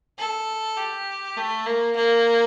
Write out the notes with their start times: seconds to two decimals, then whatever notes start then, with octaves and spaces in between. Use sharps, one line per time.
0.18 A4
0.77 G4
1.37 A3
1.66 A#3
1.96 A#3